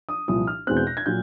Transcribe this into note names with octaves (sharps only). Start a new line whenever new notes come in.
D#6
C2 A#2 F3 D#6
F6
E2 B2 G#3 C4 F#6
G6
A#6
G#6
A#2 F#3 G6